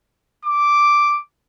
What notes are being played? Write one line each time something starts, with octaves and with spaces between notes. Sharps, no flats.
D6